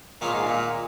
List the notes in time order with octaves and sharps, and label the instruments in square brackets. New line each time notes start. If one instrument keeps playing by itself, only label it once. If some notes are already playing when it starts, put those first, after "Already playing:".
[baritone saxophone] A#2 [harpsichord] D#3 A#3 F4 G#4 C#5
[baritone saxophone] G#2
A#2